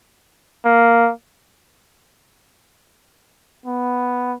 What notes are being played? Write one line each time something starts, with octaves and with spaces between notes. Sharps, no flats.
A#3
B3